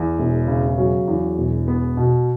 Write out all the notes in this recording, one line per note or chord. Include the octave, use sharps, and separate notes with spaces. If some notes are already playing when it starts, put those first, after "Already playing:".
Already playing: E2
E1
C#3
F#3
E2
E1
B3
B2